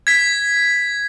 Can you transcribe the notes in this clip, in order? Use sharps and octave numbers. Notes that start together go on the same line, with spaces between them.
G#6 B6